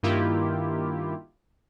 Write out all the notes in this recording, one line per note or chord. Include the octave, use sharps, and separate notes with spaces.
G2 D#3 A#3 E4 F4 G4